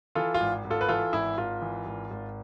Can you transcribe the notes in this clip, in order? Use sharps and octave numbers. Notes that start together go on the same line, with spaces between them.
E3 F4 A4
F4
G#1
G#1
F4 A4
B4
E3 F4 A4
G#1 E4
G#1 F4
E3
G#1
G#1